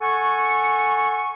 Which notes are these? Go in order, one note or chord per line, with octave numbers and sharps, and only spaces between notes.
A4 F#5 G#5 C#6